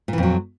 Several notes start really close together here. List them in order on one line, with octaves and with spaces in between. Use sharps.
A#2 E3 F2 F#3